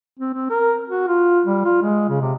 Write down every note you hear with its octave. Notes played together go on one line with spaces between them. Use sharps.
C4
C4
A#4
F#4
F4
G3
F4
G#3
C#3
C3